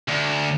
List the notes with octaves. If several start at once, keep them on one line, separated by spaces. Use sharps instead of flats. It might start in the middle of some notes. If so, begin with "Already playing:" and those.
D2